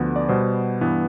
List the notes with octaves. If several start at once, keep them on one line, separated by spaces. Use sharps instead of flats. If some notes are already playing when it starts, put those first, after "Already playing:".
Already playing: D2 D3 F3 B3
D5
B2 G3 B3 C5
G2 E3 B3